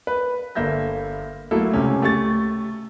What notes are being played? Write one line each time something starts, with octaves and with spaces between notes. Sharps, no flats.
B4
G1 A#3 E5 G6 A#6
F#3 A3 A#3 E4 A4
C#2 C3 C#4
A3 G4 C#6 A6